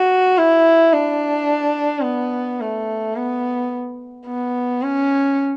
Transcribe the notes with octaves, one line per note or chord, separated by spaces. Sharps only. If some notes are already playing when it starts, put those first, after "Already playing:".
Already playing: F#4
E4
D4
B3
A3
B3
B3
C#4